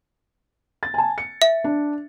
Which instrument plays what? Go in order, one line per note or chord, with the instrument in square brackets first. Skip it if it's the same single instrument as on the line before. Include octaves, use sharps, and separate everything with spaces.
[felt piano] A6
G#5 A5
C#7
[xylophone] E5
[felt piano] D4